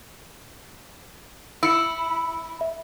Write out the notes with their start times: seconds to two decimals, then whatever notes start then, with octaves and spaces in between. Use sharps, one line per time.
1.63 E4 E6 C#7
2.61 E5